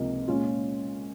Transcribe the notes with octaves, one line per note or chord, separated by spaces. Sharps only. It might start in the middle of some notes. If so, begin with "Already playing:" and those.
Already playing: C#2 C3 F3 A#3 D#4
A#2 G#3 C#4 F4